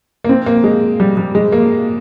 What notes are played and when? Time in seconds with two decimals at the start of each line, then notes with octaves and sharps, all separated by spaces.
0.24 A#3
0.29 C4
0.46 A#3
0.64 G#3
1.00 G3
1.17 G3
1.35 G#3
1.52 A#3